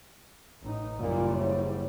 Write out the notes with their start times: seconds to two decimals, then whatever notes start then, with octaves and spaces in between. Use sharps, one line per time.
0.63 A1 D#4
0.99 F#1 A#2 G3
1.36 G#2 E4 C#5